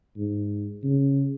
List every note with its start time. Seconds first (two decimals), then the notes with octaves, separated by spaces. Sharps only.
0.17 G#2
0.83 C#3